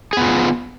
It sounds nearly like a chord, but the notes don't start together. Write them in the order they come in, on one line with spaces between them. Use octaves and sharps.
G#4 B3 F4